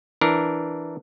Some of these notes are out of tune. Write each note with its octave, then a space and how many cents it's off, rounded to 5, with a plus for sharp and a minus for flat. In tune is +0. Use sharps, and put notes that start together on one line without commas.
E3 +0 D4 +0 A#4 +5